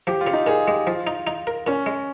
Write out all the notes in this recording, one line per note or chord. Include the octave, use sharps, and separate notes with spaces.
F3 G4
F4
C#3
D#4
A#2 G#4
G#3 G4
F3 F4
D#4
D#4
A#4
A#2 C#4
G#3